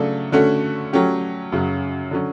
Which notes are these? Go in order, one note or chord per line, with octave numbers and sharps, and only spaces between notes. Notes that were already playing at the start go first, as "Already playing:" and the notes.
Already playing: C#3 F#3 A3 D4 A4
D3 A3 C#4 F#4
F#3 A3 C#4 G4
F#2 C#3 F#3
D3 F#3 C#4